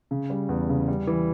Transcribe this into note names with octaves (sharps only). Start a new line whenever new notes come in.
C#3
G3
E2
C#3
G3
E3